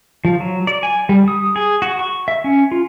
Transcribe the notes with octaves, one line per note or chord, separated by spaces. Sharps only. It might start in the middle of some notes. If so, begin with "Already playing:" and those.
F3
F#3
D5
G#5
G3
D#6
G#4
F#4
C#6
E5
C#4
F4